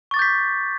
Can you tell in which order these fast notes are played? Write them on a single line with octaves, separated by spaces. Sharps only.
C#6 A6 D6 G6 B6